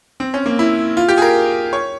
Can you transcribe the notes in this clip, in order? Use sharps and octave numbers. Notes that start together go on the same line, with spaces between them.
C4
C#4
A#3
E4
F4
G4
G#4
A#4
C#5